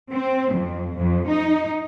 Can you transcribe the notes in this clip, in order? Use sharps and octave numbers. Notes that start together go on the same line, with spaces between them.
C4
F2
F2
D#4